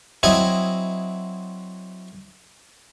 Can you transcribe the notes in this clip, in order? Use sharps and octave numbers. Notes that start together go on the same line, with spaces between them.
F#3 C4 E4 D#5 G#5